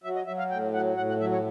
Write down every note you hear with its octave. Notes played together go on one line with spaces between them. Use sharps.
F#3 E5
D#5
F#3 E5
F5
A2 G5
F#3 F#5
A2 F#5
F#5
F#3 E5
C#5